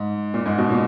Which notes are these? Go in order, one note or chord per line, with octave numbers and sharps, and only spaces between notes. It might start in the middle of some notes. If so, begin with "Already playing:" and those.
Already playing: G#2
A#2
G#2
B2
A#2